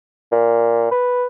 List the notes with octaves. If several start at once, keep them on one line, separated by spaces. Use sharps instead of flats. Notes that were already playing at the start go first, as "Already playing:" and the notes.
A#2
B4